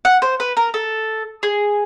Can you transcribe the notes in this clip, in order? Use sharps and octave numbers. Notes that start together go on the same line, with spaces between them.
F#5
C5
B4
A#4
A4
G#4